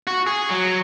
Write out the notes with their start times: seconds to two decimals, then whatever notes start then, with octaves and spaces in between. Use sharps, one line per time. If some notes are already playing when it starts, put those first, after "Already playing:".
0.07 F#4
0.27 G#4
0.50 F#3